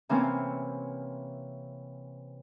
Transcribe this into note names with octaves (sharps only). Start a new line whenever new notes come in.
C3 E3 A#3 C4 C#4